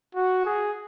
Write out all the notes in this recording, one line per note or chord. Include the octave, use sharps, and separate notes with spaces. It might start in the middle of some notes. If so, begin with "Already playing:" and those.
F#4
G#4